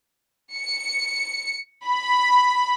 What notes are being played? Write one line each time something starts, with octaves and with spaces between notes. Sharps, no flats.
C#7
B5